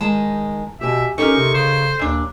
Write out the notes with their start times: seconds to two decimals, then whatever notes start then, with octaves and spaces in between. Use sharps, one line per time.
0.01 D#3 G#3 A5
0.81 B2 G4 E5 G#5
1.18 C#4 D#4 G4 A4 A#4 D5 C#6
1.37 C3
1.54 C#3 C5
1.99 D#2 A#2 D4